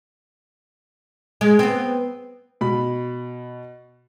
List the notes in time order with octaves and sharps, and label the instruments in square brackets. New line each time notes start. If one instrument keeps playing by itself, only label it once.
[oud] G#3
B3 C4
[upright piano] B2 B5